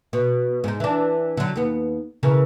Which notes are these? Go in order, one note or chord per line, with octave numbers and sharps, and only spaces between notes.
B2
G#2 D#4
E3 D4
D3 F#3
D#2 B3
C#3 E3 A#4